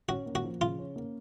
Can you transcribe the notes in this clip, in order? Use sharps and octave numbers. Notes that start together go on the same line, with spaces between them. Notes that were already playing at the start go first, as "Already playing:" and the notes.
C#4 F#4
A#3
F#4
F3
C#3 F4
C#4
A#3